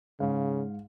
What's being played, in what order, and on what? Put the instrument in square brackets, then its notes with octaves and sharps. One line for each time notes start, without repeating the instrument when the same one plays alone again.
[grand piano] G#2 F5 [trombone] C#3